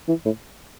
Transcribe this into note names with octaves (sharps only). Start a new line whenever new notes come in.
E3
A2